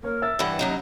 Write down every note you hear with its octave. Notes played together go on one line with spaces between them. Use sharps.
A#3 A#4 C#5
E5 E6 A6
G2 E3 F#5
D#2 F#3 C#4 D#4